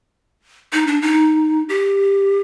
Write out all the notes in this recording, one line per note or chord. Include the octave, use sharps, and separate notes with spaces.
D#4
D4
D#4
G4